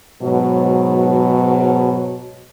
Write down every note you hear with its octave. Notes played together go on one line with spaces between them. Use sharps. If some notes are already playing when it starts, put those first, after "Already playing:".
G#2 B2 F#3